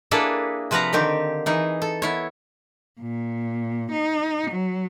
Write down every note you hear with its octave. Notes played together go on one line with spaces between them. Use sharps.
A#3 D4 E4 G#4 A4 B4
C3 F3 B4 F5 F#5 A#5
D3 D#3 C4 G4
E3 D#4 G#4
A4
B3 E4 C#5
A#2
D#4
F#3